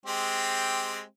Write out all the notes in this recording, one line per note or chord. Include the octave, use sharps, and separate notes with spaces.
G#3 C4 G4